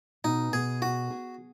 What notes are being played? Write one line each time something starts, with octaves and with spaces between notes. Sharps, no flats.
B2 D#4
B2 G#4
F#4 G#4
G#4